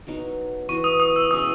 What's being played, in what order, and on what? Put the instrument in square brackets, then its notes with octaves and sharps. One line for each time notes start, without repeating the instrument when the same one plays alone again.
[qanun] F#3 B3 D#4 A#4
[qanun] E3 B3 F#4 [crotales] C#6
[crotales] D#6
D#6
E6
[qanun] B2 G#3 C#4 E4 [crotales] D#6